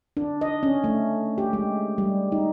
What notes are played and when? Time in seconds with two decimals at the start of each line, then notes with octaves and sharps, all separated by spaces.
0.17 D4
0.41 D#5
0.63 C#4
0.84 A3
1.38 G4
1.53 G#3
1.98 G3
2.32 D#4